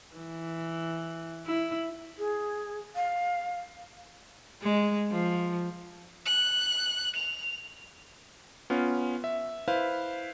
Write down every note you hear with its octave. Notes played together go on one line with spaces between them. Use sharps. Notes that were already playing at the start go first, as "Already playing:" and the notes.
E3
E4
G#4
F5
G#3
F3
F#6
F7
B3 C#4 F4
E5
E4 B4 C5 F5